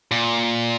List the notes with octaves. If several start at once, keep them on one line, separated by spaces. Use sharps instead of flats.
A#2